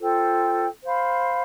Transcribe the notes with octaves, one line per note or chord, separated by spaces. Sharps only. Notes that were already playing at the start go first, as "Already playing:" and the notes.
F4 A4 C5 G5
C5 F5 B5